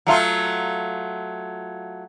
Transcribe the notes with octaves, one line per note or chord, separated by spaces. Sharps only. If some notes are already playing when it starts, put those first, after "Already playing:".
F#3 A3 F4